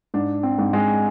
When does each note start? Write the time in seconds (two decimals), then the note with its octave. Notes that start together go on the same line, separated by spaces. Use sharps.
0.14 G#2 D4
0.43 C4
0.58 G#2
0.73 G#3